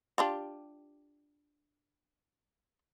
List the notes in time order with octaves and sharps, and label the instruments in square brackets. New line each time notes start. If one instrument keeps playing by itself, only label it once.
[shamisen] D4 F4 G4